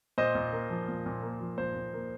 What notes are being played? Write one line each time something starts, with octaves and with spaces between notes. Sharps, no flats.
A#2 C5 D#5
A#2
A#3
F3
A#2
A#2
A#3
F3
A#2 C5
A#2
A#3